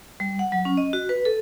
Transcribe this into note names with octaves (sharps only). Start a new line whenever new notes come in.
G3
F#5
F#3
C#4
D#5
F#4
B4
A4